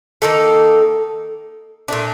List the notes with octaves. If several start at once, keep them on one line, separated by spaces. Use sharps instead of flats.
D#3 A#3 D#4 A4
A#2 A3 D4